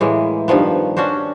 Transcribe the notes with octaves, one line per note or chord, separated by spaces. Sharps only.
A2 E3 G#3 A#3
G2 D#3 F3 B3
C#4 D4 F#4 C5